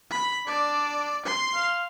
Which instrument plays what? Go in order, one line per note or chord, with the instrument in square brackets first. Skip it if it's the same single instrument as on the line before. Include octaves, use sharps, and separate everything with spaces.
[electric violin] B5
[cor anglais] D4 [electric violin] D5
[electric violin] C6
[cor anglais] F5